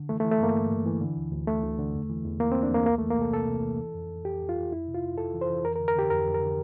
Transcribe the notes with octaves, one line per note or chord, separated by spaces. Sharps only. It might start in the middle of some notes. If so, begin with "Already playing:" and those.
Already playing: D3
E3 A3
A3
E3
A3
G2 A#3
G2
G2
E3
D3
D2
D2
D2 A3
D2
D3
E2
E3
E2
E3 A#3
C4
E2
D4
E2 A#3
C2 A#3
A3
E3
A#3
C3 A4
C3 A4
C3
E3
E3
F2
F2
F2 G4
F2
F4
F2
F2 E4
C3
F4
F2
F2 A4
E3
C5
E3
F2 A#4
A#4
D3
A#4
D3 G4
F2 A#4
F2
A#4
D3